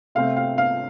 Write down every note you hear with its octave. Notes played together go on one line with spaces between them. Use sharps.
C3 A3 C4 F5
F5
F5